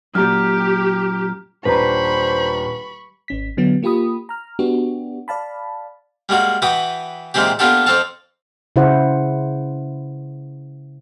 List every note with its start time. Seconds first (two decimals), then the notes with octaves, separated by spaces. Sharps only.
0.15 F#2 A#2 G4 A#5 F6
1.65 D#1 D4 B4 C5 A#5 B5 C#6
3.28 G#1 C#4 B6
3.57 D3 F#3 B3
3.83 A#3 F4 G4 B5 D#6
4.29 A#5 F6
4.59 B3 D4 F#4 G4
5.28 D5 F5 A5 B5
6.29 G3 G#3 A#3 F#4
6.62 E3 F#4 B4 G5 D#6
7.34 A#2 D#3 E3 G#3 C4 G4
7.59 A#3 B3 D4 F4 G4 A4
7.86 F2 C4 A4 F5 A5
8.76 C#3 E4 C5 F#5